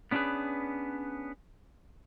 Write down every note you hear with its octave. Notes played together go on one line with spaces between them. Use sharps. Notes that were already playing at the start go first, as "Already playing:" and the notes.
B3 C#4 D4 F4 G#4 B4